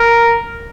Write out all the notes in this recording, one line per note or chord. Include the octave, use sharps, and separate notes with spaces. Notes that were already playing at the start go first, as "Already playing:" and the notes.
Already playing: A#4